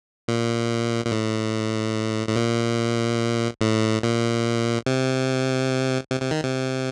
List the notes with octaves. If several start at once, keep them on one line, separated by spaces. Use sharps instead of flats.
A#2
A#2
A2
A2
A#2
A2
A#2
C3
C3
C3
D#3
C3